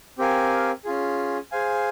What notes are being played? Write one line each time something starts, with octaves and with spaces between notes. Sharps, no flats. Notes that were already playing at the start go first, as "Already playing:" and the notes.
C4 G4 A#4 F5 G#5
C#4 F4 G#4
G#4 C5 F5 G#5